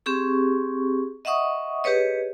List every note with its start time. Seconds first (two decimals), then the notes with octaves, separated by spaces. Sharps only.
0.06 C4 G4 G#4 C#6
1.25 D#5 E5 F#5 C#6 D#6
1.84 G4 G#4 B4 C#5 D#5